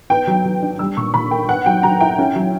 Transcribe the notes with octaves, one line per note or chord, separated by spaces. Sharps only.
B3 G5
F#3
F#3
D4
G3 E6
A#2 C#6
A#2 B5
A#3 G5
B3 F#5
F#3 G5
F#3 A#5
E4 G5
C#4
F#3